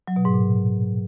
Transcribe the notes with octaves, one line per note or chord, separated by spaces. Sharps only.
F#3
B2
G#2
A#2